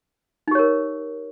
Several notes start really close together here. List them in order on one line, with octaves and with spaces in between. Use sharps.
D#4 G4 C#5 A#4